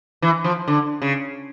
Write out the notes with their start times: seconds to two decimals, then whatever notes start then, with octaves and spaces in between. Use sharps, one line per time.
0.22 E3
0.44 F3
0.68 D3
1.02 C#3